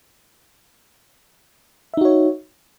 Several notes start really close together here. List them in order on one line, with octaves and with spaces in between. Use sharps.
E5 D#4 F#4 C#5